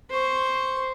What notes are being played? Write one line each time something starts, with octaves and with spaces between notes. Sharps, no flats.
C5 C#6